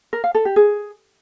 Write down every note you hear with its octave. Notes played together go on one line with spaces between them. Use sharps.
A#4
F5
A4
G4
G#4